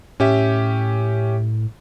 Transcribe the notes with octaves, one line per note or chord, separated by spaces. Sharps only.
A2 C#4 G4 E5